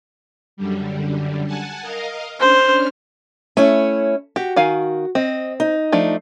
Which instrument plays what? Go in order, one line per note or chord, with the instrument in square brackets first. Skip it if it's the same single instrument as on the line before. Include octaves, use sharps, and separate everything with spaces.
[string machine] F#2 D3 G3
F#5 G#5 A5
A#4 D#5 F5
[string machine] C#4 D4 F6 [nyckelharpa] C5
[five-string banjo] A3 [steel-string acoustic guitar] C#4 E4 C#5
[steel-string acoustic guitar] F#4 [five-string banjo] G4
[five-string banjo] D#3 F5 G#5
[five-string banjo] C4 [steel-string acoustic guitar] D#5
[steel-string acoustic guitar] D#4
[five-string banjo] F3 A3 D4